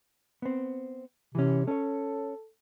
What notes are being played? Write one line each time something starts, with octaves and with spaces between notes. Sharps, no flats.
B3 C4
C3 E3 C#4
C#4 A4 C#5